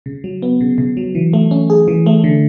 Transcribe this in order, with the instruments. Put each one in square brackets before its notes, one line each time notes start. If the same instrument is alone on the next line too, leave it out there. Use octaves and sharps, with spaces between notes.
[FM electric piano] C#3
F#3
B3
C#3
C#3
F#3
E3
A3
C#4
G#4
E3
A3
D3